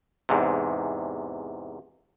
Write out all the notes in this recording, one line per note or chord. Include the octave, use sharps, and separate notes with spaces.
E2 G#2 C3